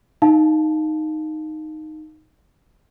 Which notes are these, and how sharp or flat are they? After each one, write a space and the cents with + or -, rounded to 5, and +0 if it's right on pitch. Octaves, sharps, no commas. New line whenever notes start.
D#4 +0 F5 +0 A5 -15